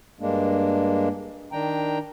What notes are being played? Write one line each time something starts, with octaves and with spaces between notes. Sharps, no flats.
G2 G#3 A#3 D4
D#3 D4 G5 A#5